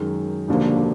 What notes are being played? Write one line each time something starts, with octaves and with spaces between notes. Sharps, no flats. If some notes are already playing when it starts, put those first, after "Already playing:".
Already playing: F#2 D#3 G#3
E1 D#2 D3 F3 A#3